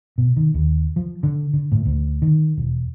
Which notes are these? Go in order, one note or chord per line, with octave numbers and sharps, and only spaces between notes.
B2
D#3
D#2
F3
D3
D3
A2
D2
D#3
E1